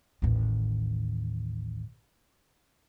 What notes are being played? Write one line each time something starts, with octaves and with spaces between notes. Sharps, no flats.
A1 D#2